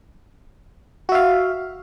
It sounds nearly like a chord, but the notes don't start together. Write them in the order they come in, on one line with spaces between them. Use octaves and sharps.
F#4 E5 F5